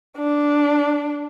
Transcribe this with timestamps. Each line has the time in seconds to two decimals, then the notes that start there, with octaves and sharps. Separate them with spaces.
0.17 D4